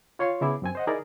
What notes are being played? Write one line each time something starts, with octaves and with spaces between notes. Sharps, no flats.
F4 C#5 F5 C6
C#3 B3 E4 G#4 E5 D6
F#2 C4 G#5
C5 D#5 F#5
D#4 E4 G#4 A#4 D5